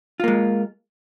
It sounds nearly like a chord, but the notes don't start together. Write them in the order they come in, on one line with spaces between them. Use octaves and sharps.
F4 A#3 G#3